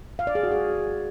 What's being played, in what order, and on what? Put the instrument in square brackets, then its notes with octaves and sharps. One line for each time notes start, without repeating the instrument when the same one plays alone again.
[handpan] F5
D5
G#4
F#4
G#4